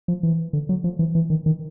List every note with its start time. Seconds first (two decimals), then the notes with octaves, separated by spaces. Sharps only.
0.08 F3
0.23 E3
0.53 D3
0.69 F#3
0.84 F3
0.99 E3
1.15 E3
1.30 D#3
1.46 D#3